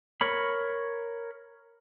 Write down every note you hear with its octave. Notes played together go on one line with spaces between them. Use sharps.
A#4 C#5 B5